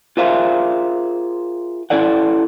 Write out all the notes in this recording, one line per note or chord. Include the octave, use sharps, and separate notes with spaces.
F4 G#4 A#4 C5 E5 F5
C#4 E4 A4 D5 F#5